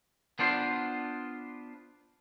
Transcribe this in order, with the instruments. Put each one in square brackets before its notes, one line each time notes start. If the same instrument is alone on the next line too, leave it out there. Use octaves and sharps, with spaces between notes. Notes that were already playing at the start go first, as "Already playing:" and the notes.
[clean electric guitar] B3 D4 F4 C5